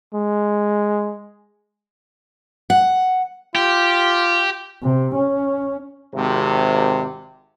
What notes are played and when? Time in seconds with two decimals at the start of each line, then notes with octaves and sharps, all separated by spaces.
0.14 G#3
2.70 F#5
3.55 F4 G4
4.83 C3
5.15 C#4
6.14 G#1 C3